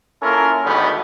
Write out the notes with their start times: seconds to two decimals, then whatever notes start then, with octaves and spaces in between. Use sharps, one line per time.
0.23 A#3 C#4 E4 F4 A4 A#4
0.65 G#1 D2 G#2 G3 A3 B3